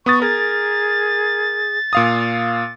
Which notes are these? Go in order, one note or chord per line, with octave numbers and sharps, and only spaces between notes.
B3 C#6 D#6 A6
G#4 A#4 A6
A#2 F5 D#6